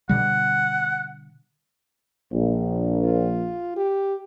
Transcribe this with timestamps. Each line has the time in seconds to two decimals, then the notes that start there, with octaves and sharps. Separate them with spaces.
0.09 B2 D3 G3 F#5
2.32 A#1
3.05 F4
3.77 G4